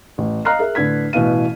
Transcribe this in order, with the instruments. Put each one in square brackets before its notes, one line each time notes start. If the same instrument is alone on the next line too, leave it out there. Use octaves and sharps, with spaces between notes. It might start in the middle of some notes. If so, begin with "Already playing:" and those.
[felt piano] A1
D#5 F5 A#5 F6 F#6 C7
G#4 A#4 E5
A2 D3 B4 G#6 B6
A1 B2 E3 E4 F5 D#7